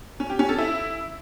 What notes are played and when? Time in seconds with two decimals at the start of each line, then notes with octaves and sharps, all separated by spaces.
0.20 C#4
0.30 G4
0.39 C#4
0.49 A4
0.58 E4